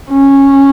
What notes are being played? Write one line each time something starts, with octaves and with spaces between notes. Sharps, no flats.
C#4